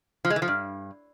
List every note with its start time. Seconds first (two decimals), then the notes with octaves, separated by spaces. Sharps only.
0.25 F3
0.30 G#3
0.36 E3
0.42 F3
0.48 G2